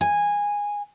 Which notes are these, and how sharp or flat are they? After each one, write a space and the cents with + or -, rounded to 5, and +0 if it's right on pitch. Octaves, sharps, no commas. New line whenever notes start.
G#5 -15